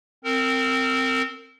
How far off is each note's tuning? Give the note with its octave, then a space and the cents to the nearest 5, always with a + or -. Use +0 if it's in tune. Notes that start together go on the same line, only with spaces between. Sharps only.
C4 +0 A#4 -25